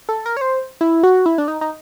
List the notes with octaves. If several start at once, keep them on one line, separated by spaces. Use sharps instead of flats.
A4
A#4
C#5
C5
E4
F#4
E4
D4
D#4
D#4